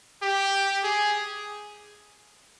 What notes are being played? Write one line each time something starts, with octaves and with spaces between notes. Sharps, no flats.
G4
G#4